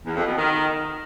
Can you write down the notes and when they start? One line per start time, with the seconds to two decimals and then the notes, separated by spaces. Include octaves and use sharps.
0.04 E2
0.15 F2
0.25 B2
0.36 D#3